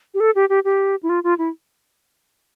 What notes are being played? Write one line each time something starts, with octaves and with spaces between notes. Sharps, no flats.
G4
A4
G4
G4
G4
E4
F4
F4
E4